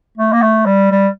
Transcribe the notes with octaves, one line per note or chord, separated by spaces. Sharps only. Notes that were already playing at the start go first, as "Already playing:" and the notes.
A3
A#3
A3
G3
G3